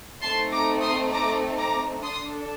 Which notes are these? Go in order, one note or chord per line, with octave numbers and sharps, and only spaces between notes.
A3 C4 D#4 A5 C6
A#5 D6
C6 D#6
A#5 D6
A#5 D6
D4 A4 C6 D#6